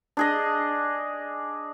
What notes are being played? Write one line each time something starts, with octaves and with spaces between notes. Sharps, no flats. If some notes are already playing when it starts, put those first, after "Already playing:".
D4 G#4 D#5